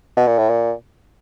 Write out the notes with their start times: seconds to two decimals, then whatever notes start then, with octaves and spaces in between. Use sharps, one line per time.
0.17 B2
0.27 A#2
0.38 A2
0.50 A#2